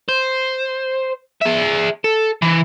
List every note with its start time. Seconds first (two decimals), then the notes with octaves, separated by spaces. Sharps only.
0.09 C5
1.41 G#4 E5
2.04 A4
2.42 E3